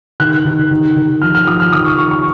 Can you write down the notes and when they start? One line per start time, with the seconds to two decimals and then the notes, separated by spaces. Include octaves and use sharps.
0.20 D#3 F#6
0.45 D#3
0.71 D#3
0.96 D#3
1.22 F3 F6
1.35 F6
1.47 F3 D#6
1.60 F6
1.73 D#3 D#6
1.86 C#6
1.98 D#3 C#6
2.11 C#6